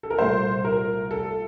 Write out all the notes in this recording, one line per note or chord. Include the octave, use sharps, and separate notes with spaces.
A4
A#4
C2 A#2 A3 C5
A#4
A4